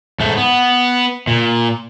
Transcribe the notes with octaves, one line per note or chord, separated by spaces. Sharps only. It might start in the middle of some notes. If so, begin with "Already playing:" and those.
G#2 A3
B3
A#2